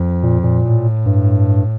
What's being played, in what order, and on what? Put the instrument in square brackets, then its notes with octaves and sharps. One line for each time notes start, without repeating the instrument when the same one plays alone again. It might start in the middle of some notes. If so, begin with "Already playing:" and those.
Already playing: [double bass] F2
[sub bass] A#2
A#2
[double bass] A2
[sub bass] G2